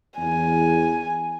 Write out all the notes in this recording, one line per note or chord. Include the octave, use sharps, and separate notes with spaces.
E2 G#5